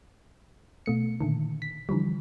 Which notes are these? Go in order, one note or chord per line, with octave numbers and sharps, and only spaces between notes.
B2 A3 C#7
A#2 D3 D#3
B6
D3 E3 F3 G3